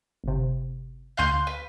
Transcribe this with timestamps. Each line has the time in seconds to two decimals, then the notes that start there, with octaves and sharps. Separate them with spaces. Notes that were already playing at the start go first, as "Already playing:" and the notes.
0.24 G1 C3
1.17 D2 F5 C6 F#6 G6
1.47 B4